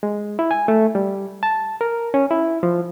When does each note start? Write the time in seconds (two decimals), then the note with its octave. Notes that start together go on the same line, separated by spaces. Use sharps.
0.03 G#3
0.39 E4
0.51 G#5
0.68 A3
0.95 G3
1.43 A5
1.81 A#4
2.14 C#4
2.31 E4
2.63 F3